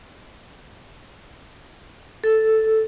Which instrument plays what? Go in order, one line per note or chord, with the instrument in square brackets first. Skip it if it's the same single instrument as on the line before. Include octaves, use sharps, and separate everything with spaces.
[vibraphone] A4